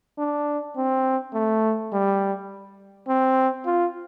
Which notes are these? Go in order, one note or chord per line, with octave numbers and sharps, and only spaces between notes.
D4
C4
A3
G3
C4
F4